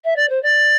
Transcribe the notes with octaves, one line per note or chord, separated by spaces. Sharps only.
E5
D5
C5
D5